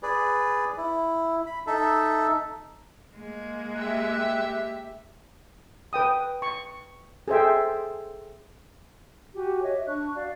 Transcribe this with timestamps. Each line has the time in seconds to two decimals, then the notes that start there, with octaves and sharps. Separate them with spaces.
0.03 G#4 B4 D5
0.77 E4
1.46 B5
1.67 D#4 A4 E5
3.16 G#3 A#3
3.76 G4 E5 F#6
5.93 B4 G5 D#6
6.42 C#6
7.28 G#4 A4 C5 E5 G5
9.34 F#4 G4 G#5
9.61 C#5 D#5 E5
9.86 D4 C#6 F#6
10.14 F#4 D5 F5